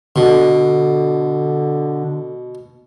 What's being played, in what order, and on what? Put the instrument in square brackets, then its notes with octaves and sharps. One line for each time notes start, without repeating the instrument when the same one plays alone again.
[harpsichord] B2 [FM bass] D3